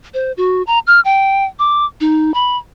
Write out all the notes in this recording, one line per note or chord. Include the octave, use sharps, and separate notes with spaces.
C5
F#4
A#5
F6
G5
D6
D#4
B5